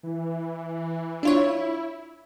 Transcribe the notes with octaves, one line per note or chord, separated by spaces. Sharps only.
E3
D4 E4 F4 C#5